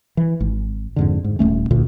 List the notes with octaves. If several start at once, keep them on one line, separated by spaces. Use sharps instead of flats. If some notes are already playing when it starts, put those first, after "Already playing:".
E3
G#1
F2 G#2 D3
G#2
D#1 F2 A3 C#4
A1 D2 A#2